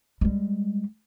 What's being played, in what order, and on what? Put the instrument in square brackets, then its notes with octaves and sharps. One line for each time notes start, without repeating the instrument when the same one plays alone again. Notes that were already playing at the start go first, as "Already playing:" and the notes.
[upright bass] G3 G#3